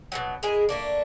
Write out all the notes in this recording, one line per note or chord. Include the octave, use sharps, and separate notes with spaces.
B2 D3 F#3
G#3 E4 G#4 A#4
A3 A#3 D4